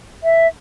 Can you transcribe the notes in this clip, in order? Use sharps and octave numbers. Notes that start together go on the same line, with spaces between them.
E5